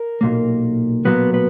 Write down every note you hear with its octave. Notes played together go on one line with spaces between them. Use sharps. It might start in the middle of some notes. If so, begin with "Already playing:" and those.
Already playing: A#4
B1 A#2 A#3
B1 A#2 F#3 A#3 B3 B4
B3 B4